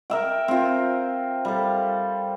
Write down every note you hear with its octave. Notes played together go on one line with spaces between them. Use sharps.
A#4 E5 G5
C4 F4
G3 A4